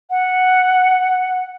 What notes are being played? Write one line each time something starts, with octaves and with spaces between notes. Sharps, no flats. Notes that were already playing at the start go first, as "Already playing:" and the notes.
F#5